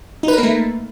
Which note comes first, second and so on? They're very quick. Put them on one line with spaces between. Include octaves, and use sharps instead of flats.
D#4 B4 A#4 A#3 A3